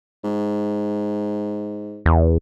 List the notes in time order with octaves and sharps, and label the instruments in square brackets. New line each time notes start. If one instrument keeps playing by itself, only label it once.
[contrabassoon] G#2
[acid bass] E2